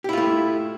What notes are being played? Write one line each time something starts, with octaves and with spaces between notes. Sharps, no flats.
A3 E4 F4 G4